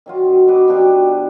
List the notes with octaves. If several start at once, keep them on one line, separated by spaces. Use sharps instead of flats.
D#3 F#3 F4
F#2
F#3 D#4 B4 D6
B2 F3 D4 G4